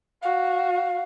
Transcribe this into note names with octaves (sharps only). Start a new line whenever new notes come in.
F#4 F5